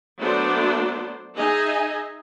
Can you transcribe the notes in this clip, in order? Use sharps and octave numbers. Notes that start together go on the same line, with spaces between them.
F#3 A3 B3 D4 C5 D5
D#4 G#4 D#5 E5 G#5